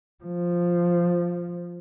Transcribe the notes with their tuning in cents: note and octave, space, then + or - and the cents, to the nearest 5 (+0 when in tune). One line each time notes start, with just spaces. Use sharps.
F3 +0